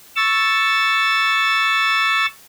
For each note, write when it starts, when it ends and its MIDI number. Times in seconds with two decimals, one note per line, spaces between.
0.16 2.26 85
0.16 2.26 88
0.16 2.26 93